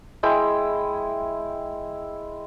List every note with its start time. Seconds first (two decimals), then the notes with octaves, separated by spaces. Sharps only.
0.23 G#3 E4 G5